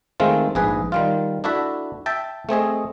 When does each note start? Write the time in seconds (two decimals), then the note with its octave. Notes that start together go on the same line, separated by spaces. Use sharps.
0.20 D#3 G#3 A3 C4 F4
0.55 A#1 G#2 G#4 B4
0.92 D#3 G3 F4
1.44 D4 E4 F#4 A4 E5
2.06 E5 G5 A5
2.49 A3 C4 G#4 D#5